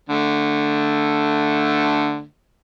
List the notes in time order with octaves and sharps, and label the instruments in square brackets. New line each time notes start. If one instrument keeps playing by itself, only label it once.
[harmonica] D3 A3